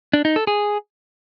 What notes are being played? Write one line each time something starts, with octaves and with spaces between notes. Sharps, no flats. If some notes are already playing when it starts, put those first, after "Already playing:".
D4
D#4
A4
G#4